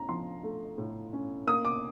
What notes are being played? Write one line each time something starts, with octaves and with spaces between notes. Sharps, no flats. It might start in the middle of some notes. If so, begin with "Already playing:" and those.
Already playing: A2 C#4 A#5
F3 C6
A3
A2
C#4
A#3 D#6
D6